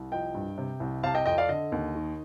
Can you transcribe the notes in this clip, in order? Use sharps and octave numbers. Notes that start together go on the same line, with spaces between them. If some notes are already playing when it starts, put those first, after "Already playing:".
Already playing: C2
F3 D#5 G5
G2
C3
C2
C3 F5 A5
D#5 G5
F2 D#5 G5
D5 F5
D3 D#5
D#2
D#3